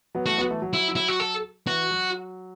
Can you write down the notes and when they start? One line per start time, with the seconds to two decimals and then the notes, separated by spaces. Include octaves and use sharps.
0.15 F#3 B3
0.26 E3 A3 F#4
0.38 F#3 B3
0.50 E3 A3
0.62 F#3
0.73 E4
0.96 E4
1.08 F#4
1.20 A4
1.67 E3 F#4
1.91 F#3